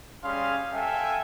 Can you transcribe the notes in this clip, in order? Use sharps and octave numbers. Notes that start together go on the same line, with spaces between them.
G3 C#4 G#4 F5 C6
A4 E5 F5 G5 G#5